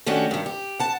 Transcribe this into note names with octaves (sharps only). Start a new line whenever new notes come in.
D#3 A3 C#4 D4 F#4 G4
G2 D#3
G4
F#5 A5